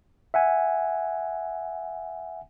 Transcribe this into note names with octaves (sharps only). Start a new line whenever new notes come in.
E5 F#5 G#5